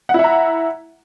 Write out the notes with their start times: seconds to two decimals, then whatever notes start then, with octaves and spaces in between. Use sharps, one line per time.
0.09 F#5
0.14 E4
0.19 E5
0.24 A#5